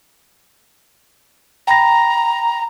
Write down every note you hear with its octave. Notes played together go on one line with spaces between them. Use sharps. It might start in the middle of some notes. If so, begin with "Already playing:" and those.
G5 A#5 B5 A#6